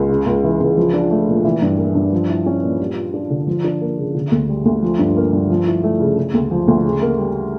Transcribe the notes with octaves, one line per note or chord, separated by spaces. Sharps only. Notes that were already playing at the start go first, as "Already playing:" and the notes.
Already playing: C#2
C#3
C#2
E3
C#2
F3
D4
A3
A#2
E3
G2
A#3
G2
F3
E4
C#4
A#2
G3
F4
D4
D3
F3
D4
A#3
C#3
D3
D2
G3
D2
F3
G2
A#3
G2
F3
E4
A3
C#3
C#3
D2
F3
D2
C#3
A#3
G3